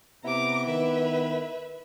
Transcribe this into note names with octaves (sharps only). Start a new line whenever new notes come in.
C3 B3 E4 A#5 D6
D#3 B4 E5